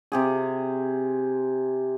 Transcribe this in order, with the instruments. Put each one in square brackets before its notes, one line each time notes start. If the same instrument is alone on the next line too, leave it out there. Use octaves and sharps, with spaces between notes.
[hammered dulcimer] C3 G4 G#4